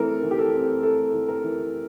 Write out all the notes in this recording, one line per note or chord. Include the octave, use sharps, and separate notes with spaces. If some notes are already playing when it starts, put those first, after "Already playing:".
Already playing: E3 A3 C4 A4 A#4
E3
G4
A4
C4
A3 A4
E3
A#4
E3